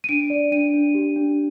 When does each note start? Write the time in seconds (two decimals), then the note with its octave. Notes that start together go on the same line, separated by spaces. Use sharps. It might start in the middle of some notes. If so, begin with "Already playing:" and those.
0.04 D#7
0.09 D4 D7
0.30 D5
0.52 D4 D#7
0.74 D4
0.95 G4
1.16 D4